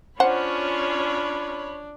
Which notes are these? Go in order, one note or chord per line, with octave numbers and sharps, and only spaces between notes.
C#4 D4 F4 C5 C#5 F#5 B5